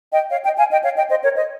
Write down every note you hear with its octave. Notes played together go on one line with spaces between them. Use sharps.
D#5 G5
C#5 F5
D#5 G5
F5 G#5
D#5 G5
C#5 F5
D#5 G5
C5 D#5
A#4 C#5
C5 D#5